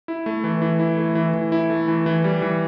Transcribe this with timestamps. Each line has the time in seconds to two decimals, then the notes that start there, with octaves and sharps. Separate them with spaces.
0.08 E4
0.26 A3
0.44 E3
0.62 E3
0.79 E4
0.97 A3
1.15 E3
1.34 E3
1.52 E4
1.70 A3
1.88 E3
2.06 E3
2.24 G3
2.42 E3